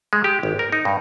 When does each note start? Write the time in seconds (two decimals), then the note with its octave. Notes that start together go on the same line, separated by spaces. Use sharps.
0.13 G#3
0.24 G4
0.43 G#1
0.59 A#4
0.72 D#4
0.85 G2